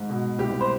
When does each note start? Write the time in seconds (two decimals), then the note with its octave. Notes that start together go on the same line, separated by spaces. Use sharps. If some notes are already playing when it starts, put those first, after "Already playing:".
Already playing: G#2
0.10 B2
0.39 C2 G4
0.61 C5